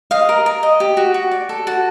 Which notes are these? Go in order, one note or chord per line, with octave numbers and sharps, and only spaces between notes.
D#5 F5
A#4
A#4
D#5
G4
F#4
F#4
D5
A4
F#4 A5